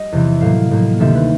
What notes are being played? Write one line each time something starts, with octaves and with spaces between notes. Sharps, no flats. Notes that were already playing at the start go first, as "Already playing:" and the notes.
Already playing: G3 D#5
E2 C3 E3
A2 F#3 A#3 F5
A2 F#3 A#3
D2 C3 D#3 G3 E5
B4